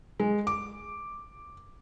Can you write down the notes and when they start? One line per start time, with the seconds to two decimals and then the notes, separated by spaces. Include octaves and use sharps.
0.20 G#3
0.47 D6